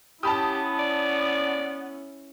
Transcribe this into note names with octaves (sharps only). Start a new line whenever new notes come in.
B3 C#4 E4 G4 A5 B5 D#6
D5